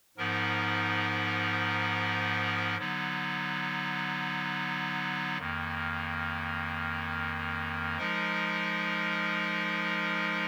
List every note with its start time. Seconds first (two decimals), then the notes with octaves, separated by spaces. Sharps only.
0.17 G#2 F3 B3 D#4 A#4
2.78 D3 F#3 B3 D#4
5.38 F2 D#3 A#3
7.98 F3 G#3 D#4 A#4